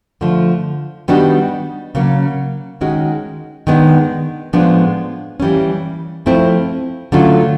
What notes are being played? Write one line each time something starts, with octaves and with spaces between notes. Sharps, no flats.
D3 F3 A3
D#3 G3 B3 D4 F#4
C#3 F#3 A#3 C#4
D#3 G#3 C#4 F#4
D#3 G#3 B3 D4
A2 F3 G#3 B3 D4
E3 G3 A#3 C#4
F3 A3 C4 E4
D3 F#3 A3 C#4 F4